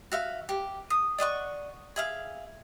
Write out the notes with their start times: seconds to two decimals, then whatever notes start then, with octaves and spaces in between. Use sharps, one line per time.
0.12 F#4 E5 F5
0.49 G4
0.90 D#6
1.18 D5 D#5 F#5 C#6
1.96 G#4 E5 F5